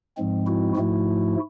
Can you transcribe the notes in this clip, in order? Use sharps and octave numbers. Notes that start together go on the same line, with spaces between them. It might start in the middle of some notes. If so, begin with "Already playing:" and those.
G#2 F3 G#3 C4
E4 F#4
G#2 F3 A3 E4 F#4